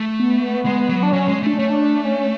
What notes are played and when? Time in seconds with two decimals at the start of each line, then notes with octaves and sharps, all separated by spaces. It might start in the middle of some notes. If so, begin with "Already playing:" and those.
Already playing: A3
0.19 B3
0.66 G#3
0.89 F#3
1.03 D4
1.13 F#3 C#4
1.28 G#3
1.43 A3 D4
1.58 A3 C#4
1.70 D4
2.05 C#4